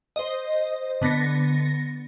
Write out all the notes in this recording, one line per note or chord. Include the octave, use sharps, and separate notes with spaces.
C5 D#5
D3 B3 A6 A#6 C#7